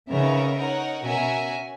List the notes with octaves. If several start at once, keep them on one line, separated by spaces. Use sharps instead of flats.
C#3 B3 D#4 A#4 C#5 E5
D#4 A#4 C#5 F#5
B2 C#4 F#4 A#4 E5 G#5